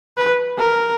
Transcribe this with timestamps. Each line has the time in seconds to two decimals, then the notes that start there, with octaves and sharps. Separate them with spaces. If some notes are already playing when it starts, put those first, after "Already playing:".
0.17 B4
0.57 A#4